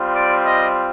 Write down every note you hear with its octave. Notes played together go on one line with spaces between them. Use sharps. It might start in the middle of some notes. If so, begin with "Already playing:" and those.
Already playing: G3 C4 F4
D5
D#5